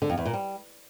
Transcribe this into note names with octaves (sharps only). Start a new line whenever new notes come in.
D3
F2
E2
A#2
G3